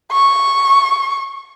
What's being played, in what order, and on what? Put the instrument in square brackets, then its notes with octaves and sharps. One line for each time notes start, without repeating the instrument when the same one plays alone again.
[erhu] C#6